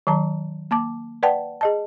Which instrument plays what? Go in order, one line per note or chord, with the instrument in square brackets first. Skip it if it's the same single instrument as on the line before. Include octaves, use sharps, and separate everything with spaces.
[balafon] D#3 F#3 A5 A#5
A#3 A5 D6
B4 D5 F#5 G5 A5
G#4 D#5 A5